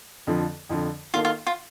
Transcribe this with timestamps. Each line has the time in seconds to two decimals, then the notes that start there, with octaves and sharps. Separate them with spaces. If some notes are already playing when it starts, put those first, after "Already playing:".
0.27 F2 D3 F3
0.69 F2 D3 F3
1.14 D#3 A#3 D#4 F4 A4
1.25 F4
1.46 F4